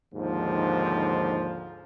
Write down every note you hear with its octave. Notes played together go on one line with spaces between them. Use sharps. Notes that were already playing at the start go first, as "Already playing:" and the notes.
D#2 G#2 D3 F3